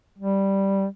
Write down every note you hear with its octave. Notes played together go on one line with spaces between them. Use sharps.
G3